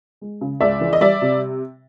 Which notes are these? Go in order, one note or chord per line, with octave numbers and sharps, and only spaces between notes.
G#3
C#3
C#2 D5 E5
E3
D#5
G3 D5 E5
C3